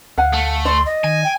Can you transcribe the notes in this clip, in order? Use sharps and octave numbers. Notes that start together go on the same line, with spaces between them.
D2 F5 F#5 G#5
A3
D5 C6
D#5
D#3 G#5
G5